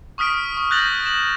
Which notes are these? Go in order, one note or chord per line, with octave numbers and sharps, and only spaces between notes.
C#6 D#6 F6 B6 D7
C#6
F#6 G6 A6 A#6 F7 F#7
E7 F#7